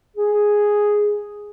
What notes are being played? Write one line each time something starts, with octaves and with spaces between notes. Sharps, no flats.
G#4